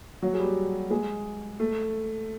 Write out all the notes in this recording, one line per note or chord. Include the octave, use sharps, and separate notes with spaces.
F#3 F#4
G#4
G3 G4
G#3 G#4
A3 A4